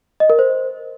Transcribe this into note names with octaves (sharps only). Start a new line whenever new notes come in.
D#5
A#4
C5